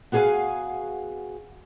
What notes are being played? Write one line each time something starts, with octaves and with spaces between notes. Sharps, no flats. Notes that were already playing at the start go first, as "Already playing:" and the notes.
B3 F#4 G#4 C#5 F5 G#5